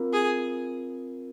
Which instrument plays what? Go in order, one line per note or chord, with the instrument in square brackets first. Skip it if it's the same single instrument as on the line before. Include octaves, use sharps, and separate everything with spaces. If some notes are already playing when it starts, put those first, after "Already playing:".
Already playing: [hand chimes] C4 F4 A#4
[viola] G#4